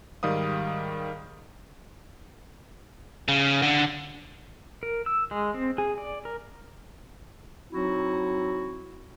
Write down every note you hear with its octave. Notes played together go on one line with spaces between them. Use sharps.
G#2 D#3 G3 F5 D#6
C#3
D3
A#4
E6
G#3
C4
G#4
D5
A#4
F#3 C4 D#4 E4 F#4